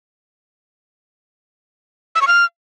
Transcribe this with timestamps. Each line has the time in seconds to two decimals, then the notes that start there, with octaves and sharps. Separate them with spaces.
2.15 E6
2.21 C#6
2.27 F6